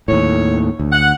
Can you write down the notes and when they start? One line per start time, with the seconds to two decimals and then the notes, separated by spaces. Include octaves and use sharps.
0.08 D#2 A2 C#5
0.80 D2
0.92 F#5